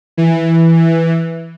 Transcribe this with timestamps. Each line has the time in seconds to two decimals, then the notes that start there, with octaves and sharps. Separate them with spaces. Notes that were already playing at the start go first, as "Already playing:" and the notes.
0.17 E3